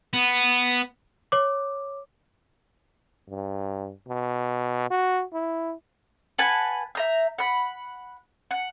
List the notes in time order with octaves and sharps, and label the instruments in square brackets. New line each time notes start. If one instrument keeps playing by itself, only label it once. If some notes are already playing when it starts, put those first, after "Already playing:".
[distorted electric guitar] B3
[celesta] C#5 D6
[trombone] G2
B2
F#4
E4
[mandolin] B4 F#5 G#5 A5
E5 A#5 G6
F#5 B5
F#5